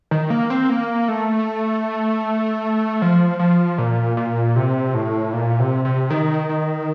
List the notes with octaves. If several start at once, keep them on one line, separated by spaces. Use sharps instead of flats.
D#3
A#3
C4
A#3
A3
F3
F3
A#2
A#2
C3
A2
A#2
C3
C3
D#3
D#3